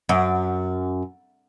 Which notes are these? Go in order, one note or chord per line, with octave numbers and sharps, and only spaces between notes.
F#2